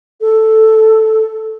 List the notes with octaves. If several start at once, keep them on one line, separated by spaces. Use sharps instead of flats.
A4